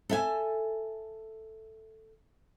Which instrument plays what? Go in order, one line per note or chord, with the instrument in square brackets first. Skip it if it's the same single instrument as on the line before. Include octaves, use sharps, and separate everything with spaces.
[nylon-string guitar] A4 E5 G#5